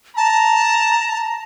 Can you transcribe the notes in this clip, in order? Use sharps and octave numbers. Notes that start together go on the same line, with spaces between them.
A5 A#5